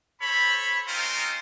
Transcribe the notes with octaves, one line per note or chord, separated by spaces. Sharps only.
A4 C5 C#5 B5
C4 C#4 D#4 F4 A#4 C5